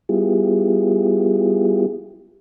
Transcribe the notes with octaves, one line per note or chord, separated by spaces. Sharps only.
G3 B3 E4 F4 G4 G#4